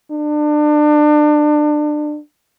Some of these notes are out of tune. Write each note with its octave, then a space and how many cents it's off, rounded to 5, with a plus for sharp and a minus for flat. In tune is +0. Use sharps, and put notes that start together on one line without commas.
D4 +30